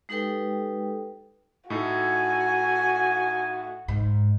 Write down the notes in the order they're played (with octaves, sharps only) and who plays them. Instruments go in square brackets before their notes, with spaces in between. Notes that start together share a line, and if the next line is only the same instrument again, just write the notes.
[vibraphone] G#3 D#4 G4 A4 B4 G5
[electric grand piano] A2 D#4 A4 [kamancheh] F#4 [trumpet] G#5
[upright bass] G#2